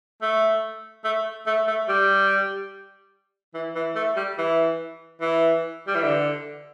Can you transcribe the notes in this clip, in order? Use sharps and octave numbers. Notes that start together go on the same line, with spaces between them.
A3
A3
A3
A3
G3
E3
E3
A3
G3
E3
E3
G3
E3
D3